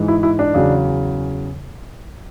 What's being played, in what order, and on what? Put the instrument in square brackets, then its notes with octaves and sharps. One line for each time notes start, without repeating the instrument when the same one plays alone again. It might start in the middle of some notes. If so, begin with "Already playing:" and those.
Already playing: [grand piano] G#2 E3 G#3
E4
E4
D4
E2 C#3 F#3